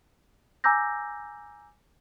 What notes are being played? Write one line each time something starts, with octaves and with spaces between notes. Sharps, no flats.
G#5 A#5 D6 E6 G6 A#6